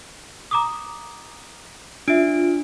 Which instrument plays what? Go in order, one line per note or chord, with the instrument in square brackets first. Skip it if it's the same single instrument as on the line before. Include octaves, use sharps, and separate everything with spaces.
[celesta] A#5 D6 D#6
[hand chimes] D4 [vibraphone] F4 [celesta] E5 D7